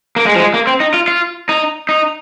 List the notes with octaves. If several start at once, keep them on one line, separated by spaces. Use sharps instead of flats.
A#3
G#3
F3
G#3
A#3
C4
D#4
F4
F4
D#4
D#4